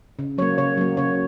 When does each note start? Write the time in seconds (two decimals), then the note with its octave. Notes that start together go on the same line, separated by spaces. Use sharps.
0.19 C#3
0.38 F#3 A#3 C#5
0.58 C#3 C#5
0.77 F#3 A#3
0.97 C#3 C#5